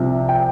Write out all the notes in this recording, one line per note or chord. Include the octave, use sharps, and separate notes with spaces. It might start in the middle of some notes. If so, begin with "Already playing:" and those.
Already playing: C2 C3 F3
G5